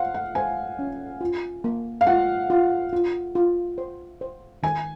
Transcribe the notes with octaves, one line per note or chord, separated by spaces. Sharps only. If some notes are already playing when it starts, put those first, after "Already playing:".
Already playing: C5 F5 F#5
F#5
C5 G#5
C#4
F4
A#3
F5
F4 F#5
F4
F4
F4
C5
C5
D#3 G#5